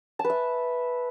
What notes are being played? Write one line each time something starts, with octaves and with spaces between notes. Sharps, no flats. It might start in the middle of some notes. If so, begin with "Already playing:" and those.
A5
B4
E5